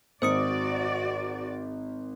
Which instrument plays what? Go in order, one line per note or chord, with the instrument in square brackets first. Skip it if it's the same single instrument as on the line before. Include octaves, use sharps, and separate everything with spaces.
[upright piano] G#1 [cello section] F#4 D5 [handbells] C5 D#6 C#7